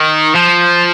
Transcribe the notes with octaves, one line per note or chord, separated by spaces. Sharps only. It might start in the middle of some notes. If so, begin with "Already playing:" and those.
Already playing: D#3
F3